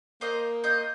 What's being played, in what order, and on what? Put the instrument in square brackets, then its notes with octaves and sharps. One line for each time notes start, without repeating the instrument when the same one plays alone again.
[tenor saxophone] A#3 [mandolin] C5 D#5
[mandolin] C5 D#5